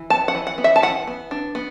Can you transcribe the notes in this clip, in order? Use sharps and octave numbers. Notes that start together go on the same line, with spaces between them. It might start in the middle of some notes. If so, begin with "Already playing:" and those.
Already playing: E3
B3 A5
F#5
E3
F#5
B3
E5
A5
E3 F#5
B3
D4
B3